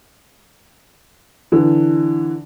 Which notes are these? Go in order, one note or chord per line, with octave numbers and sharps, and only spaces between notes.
D3 E3